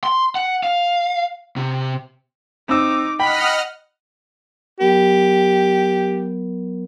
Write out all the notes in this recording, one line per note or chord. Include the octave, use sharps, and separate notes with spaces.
C6
F#5
F5
C3
C4 D#4 D6 E6
D#5 F#5 G5 B5 F6
F#3 B3 G4 A#4